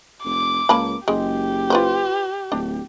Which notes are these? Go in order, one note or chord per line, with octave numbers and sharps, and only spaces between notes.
F1 D6
C#2 A#3 A5 B5
F#1 G#3 G4
F4 B4 C5
D1 D4